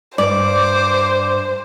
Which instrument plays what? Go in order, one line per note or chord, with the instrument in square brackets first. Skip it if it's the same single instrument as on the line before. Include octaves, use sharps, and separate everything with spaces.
[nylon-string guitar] G2 [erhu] C5 [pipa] D5 [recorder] D6